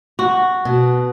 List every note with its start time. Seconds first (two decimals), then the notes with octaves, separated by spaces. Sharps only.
0.19 F#4
0.65 B2